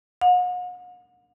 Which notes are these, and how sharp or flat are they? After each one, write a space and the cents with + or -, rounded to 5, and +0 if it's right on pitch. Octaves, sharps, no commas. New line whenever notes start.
F#5 -40